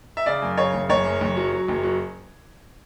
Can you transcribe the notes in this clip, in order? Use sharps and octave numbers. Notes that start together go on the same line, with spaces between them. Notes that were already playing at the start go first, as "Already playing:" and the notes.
E5
C#3 D5
F#2
C#3 C#5
F#1
F#1 C#5
F#2
F#1
F#3
F#3
F#1
F#3